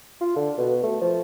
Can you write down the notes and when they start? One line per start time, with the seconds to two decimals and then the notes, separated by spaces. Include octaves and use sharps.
0.21 F4
0.36 D3
0.58 B2
0.83 A3
1.01 F3